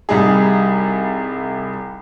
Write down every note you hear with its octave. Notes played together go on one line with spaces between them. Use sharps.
C2 G3 D#4 G#4